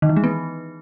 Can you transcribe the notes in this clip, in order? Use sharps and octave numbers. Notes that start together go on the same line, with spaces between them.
D#3
E3
G#3
B3